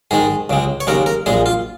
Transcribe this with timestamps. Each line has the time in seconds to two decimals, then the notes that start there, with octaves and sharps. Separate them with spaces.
0.11 G#2 D#3 G#3 G#4
0.50 C#2 C#3 G#3
0.80 C#5
0.87 D#2 C#3 G#3 A#4
1.06 A#4
1.26 A#1 A#2 G#3 G#4
1.46 F4